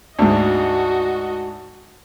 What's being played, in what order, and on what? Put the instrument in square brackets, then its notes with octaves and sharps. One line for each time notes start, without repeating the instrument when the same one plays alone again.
[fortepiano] D2 G#2 [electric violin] F#4 D#5